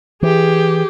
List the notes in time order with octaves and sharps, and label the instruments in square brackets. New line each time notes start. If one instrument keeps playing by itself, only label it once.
[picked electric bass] E3 [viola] G4 G#4